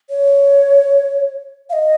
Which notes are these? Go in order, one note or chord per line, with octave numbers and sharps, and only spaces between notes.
C#5
F5
D#5